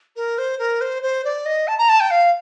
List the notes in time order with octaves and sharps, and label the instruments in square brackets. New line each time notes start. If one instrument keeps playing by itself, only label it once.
[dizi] A#4
C5
A#4
C5
C5
D5
D#5
A5
A#5
A5
G5
F5